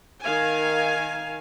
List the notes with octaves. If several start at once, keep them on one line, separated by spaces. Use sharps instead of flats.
D#3 F5 G#5